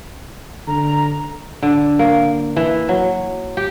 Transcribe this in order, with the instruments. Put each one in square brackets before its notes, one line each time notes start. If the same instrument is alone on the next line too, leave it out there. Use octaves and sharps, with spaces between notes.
[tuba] D3 [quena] A#5
[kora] D3
A#3
E3
F#3
G4